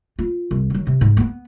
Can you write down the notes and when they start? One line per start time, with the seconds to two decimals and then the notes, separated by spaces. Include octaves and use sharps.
0.19 F4
0.51 C2
0.70 D#3 F#3
0.87 C3
1.01 G#2
1.17 A#3 B3